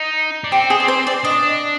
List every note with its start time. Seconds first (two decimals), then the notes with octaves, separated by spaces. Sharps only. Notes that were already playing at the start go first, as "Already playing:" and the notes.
Already playing: D#4
0.44 D4
0.52 C4 G4
0.70 G#4
0.80 D5
0.88 C5
1.07 D5
1.24 D4 D#5